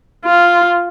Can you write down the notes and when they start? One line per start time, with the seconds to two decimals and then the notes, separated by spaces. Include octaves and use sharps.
0.25 F4